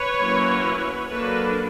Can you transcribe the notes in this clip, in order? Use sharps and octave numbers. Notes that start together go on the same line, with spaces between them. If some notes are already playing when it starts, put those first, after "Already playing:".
Already playing: B4 C#5
F#3 A#3 C#4 E4
F#3 A#3 D4 A4 B4